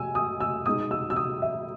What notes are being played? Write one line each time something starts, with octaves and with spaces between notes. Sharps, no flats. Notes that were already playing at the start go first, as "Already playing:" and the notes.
Already playing: G#5 E6
D#6
E6
B2 G#3 D#4 D#6
E6
E6
D#6
E5